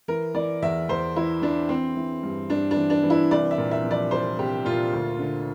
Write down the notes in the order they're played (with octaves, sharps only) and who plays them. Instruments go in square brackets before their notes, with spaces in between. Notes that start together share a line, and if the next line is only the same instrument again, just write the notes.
[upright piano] E3 A#4
E3 D5
E2 E5
E2 C5
E3 E4
E3 D4
E3 C4
E3
G2
G2 D4
D4
E3
D4
E3
E4
C2 D5
E5
A#2
E5
F3
D5
C2 C5
C2 G4
A#2 F4
D2
D3